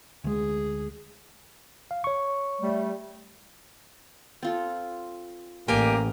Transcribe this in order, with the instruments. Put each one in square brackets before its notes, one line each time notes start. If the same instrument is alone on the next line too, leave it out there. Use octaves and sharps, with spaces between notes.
[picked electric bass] D2 G#3 [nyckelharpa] G#4
[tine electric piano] F5
C#5 C#6
[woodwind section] G3 A3
[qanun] C4 F4 A4
[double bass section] A1 [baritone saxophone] A#3 [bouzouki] G4 G#5